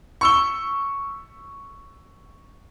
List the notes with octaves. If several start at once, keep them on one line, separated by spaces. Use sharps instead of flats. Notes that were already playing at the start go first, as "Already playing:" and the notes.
C#6 E6 G7